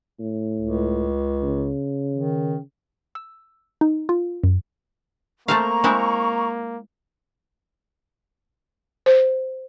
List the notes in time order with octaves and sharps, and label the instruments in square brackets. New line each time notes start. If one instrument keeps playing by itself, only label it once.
[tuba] A2
[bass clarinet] C#2
[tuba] C#3
[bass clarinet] D#3
[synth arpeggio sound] E6
D#4
F4
F#2
[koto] A3 C4 F5 [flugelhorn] A#3 [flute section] A#5 C#6
[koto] G#3 C4 E4
[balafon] C5